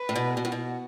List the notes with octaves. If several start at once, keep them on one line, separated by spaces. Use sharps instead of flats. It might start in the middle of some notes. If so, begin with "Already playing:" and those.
Already playing: B4
A2
B2
B2 F#4
A2
B2